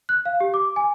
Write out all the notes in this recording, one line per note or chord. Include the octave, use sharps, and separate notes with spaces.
F#6
F5
G4
D6
G#5